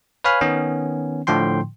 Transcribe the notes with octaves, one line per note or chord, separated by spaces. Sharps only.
B4 C#5 F5 G#5 B5 F6
D#3 B3 C#4
A2 D3 F3 G5 C6